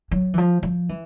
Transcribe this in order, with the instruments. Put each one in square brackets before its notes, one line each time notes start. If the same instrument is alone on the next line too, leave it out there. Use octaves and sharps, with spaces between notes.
[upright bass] F#3
E3
F3
F3
E3